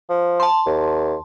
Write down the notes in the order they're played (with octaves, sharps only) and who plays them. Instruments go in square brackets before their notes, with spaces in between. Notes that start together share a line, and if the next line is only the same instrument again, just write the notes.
[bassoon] F3
[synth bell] A5 C6
[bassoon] D#2